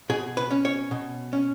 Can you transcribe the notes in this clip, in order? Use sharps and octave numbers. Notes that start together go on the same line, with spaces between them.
B2 G#4
B4
C#4
C#5
B2
C#4